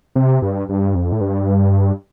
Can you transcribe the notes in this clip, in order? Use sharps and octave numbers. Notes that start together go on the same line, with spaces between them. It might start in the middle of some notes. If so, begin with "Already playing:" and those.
C3
G2
G2
F2
A2
G2